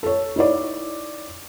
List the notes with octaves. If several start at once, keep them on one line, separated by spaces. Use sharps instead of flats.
A4 C#5
D#4 E4 C#5 D5